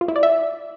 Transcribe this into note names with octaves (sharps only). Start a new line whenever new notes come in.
F4
E4
D5
E5